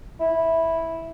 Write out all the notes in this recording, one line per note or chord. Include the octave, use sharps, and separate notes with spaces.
E4